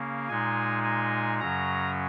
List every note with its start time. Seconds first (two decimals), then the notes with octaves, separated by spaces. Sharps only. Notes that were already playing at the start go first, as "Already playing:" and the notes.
Already playing: C#3 A#3 C#4
0.28 A#2 G#3 D#4 G#5
0.84 G#5
1.40 F#2 C#3 F#3 C#4 A#5